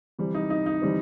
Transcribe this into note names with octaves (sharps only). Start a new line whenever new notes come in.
C3 E3 G3 C4
D#4
D#4
D#4
C3 E3 G3 C4